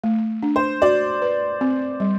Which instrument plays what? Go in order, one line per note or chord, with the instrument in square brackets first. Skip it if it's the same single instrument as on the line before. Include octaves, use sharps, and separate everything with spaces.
[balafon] A3
D4
[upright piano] C5
[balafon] F#4 [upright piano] D5
[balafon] B4
C4
G3